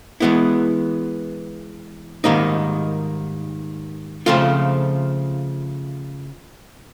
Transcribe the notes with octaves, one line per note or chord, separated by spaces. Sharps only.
E3 G#3 B3 E4
G#2 D#3 G3 A#3 D#4
C#3 F3 A3 C4 F4